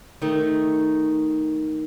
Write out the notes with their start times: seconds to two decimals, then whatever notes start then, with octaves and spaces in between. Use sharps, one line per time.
0.22 D#3 A3 D#4